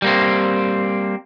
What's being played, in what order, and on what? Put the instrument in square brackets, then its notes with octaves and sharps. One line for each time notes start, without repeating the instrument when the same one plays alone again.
[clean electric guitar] G3 A#3 C4